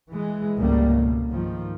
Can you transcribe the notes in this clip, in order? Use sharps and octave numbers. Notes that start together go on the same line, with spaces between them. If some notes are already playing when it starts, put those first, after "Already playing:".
E3 G#3
G#1 C#2 G3 A3 A#3
B2
G#2 D#3 F3